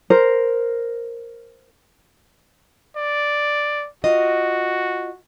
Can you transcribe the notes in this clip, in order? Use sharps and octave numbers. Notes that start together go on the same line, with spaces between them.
A#4 C5
D5
F4 F#4 D#5